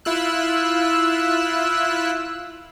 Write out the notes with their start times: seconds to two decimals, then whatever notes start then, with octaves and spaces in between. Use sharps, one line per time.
0.05 E4 F4 E6 F#6